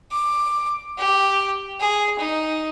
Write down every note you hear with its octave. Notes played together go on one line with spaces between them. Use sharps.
D6
G4
G#4
D#4